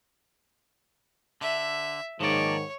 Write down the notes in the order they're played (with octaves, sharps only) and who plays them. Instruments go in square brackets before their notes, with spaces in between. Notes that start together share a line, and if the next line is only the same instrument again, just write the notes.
[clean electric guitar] D3 [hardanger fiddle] E5
[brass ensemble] G#2 D#3 [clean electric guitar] F3 A#3 D5 [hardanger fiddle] C#5